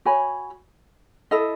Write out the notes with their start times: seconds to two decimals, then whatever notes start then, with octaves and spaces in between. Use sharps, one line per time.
0.05 F#4 C#5 G#5 B5
1.31 E4 A4 D#5